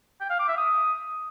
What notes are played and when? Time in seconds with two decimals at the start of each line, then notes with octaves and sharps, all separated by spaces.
0.21 G5
0.30 F5
0.39 D6
0.48 E5
0.57 D#6